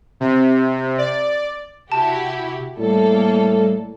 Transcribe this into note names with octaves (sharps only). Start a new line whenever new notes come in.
C3
D5
C3 E4 F#4 G4 A5
A2 G3 A#3 A4